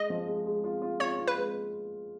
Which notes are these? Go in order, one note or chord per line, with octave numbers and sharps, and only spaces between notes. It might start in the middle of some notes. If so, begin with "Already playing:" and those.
Already playing: G#3 D#5
F3
G#3
G#3
F4
F4
F4 C#5
F4
B4
G#3